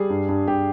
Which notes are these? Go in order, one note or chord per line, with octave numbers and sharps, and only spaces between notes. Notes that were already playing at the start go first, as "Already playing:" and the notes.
Already playing: G3 G#4
G2
G2
G2 G4